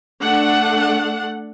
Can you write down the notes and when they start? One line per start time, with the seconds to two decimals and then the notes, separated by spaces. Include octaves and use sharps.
0.21 A3 D4 F#5